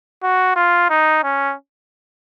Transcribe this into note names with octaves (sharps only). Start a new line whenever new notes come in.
F#4
F4
D#4
C#4